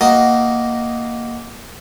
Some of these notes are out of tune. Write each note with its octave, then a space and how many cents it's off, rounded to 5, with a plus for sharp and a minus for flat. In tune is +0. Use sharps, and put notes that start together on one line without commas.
A#3 +0 D#4 +0 F#4 +10